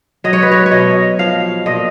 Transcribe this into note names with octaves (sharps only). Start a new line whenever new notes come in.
F#3 D#5
C#5
B4
C#5
C#5
B2 D#5
F3 F5
A#2 D#5